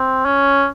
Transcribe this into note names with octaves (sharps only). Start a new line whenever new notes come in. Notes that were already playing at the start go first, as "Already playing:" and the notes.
Already playing: C4
C#4